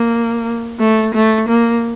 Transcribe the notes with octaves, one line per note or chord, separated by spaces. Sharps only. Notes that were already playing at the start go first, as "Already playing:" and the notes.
Already playing: A#3
A3
A3
A#3